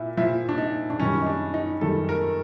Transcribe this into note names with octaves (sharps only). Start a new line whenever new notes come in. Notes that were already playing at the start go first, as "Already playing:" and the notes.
Already playing: A#2 E4
A#2 F3 E4
D4
D#4
D4
F#2 D#3 G3 C#4
D#4
D4
D#4
F#2 D#3 G3 A4
A#4